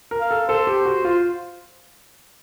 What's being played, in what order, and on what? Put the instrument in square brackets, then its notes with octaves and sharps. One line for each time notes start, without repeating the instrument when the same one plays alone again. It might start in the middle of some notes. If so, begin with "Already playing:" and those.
[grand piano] A#4
[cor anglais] F5
[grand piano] A4
[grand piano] A4 [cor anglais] C5
[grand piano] G4
F#4
F4